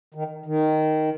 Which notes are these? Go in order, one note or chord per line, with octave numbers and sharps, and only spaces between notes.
D#3
D#3